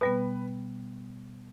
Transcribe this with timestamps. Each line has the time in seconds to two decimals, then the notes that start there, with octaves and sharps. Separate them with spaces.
0.01 B2 G3 B3 B4